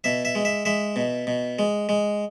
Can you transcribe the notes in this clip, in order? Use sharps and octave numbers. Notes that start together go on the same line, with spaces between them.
B2 E5
E5
G#3
E5
G#3 E5
B2
B2
G#3
G#3